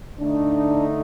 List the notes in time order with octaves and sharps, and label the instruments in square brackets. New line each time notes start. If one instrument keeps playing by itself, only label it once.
[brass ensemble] D3 A3 D#4 [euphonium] D4